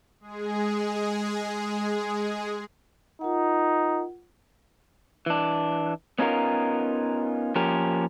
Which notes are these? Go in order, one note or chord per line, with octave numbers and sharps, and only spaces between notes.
G#3 G#4
D#4 F4 A#4 F#5
E3 D4
B3 C#4 D#4 F4 A#4
F3 A#3 C#4 G4 A#4